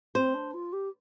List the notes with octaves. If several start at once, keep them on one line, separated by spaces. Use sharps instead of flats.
C4 C5
D4
F4
G4